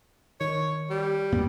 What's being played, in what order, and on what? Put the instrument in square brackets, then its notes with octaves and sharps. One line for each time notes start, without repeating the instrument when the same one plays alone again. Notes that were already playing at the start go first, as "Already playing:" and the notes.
[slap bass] D#3 [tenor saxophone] C#5
[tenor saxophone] G3
[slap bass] E2 A#2 B3